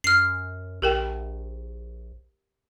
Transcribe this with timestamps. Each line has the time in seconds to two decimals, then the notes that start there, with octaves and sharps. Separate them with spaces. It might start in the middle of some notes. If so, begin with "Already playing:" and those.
0.04 F#2 F6 C7
0.82 A#1 G4 A#4 G5